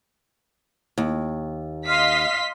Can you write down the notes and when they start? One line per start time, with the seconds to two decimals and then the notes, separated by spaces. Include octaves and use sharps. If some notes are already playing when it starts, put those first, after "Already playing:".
0.98 D#2
1.87 D#5 F5 C6 B6